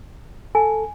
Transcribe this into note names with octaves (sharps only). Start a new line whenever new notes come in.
A4 G#5